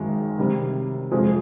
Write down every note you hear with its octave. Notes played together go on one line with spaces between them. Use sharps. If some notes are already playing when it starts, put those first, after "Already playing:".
Already playing: G#1 F#2 D#3 G#3
C3 D#3 G3
F#1 F2 C3 F3 G#3